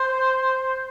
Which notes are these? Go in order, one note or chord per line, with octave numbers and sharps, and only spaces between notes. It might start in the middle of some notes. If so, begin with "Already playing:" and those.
Already playing: C5